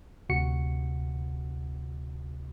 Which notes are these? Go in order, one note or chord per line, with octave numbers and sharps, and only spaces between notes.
D2 C3 F#4 C#7